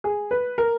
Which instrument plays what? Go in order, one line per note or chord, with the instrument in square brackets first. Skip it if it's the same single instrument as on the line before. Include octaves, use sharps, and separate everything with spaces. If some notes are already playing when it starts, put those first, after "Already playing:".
[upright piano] G#4
B4
A#4